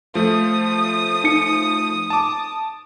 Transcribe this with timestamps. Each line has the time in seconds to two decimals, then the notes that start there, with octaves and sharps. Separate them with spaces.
0.15 F3 A3 D#6
1.24 D#4 C#7
2.10 A5 D6